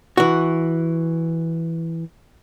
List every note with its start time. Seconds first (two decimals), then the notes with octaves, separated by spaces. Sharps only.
0.17 E3 F#4